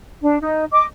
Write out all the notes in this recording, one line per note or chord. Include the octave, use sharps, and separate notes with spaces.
D4
D#4
D#5 D6